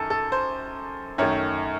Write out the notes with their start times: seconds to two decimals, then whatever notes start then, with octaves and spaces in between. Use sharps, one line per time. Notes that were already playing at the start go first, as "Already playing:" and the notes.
Already playing: F#2 D#3 A4
0.10 A4
0.32 C5
1.18 F#2 D#3 A3 C#5